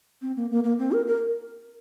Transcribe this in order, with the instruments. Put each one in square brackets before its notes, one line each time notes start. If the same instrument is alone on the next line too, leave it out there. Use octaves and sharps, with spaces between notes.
[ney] C4
A#3
A#3
A#3
C4
A#4
A#4